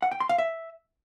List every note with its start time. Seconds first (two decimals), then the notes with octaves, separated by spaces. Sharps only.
0.02 F#5
0.11 G5
0.20 C6
0.29 F5
0.38 E5